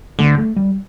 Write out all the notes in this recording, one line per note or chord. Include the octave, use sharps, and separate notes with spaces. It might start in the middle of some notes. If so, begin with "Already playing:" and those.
D3 A3
A3
G3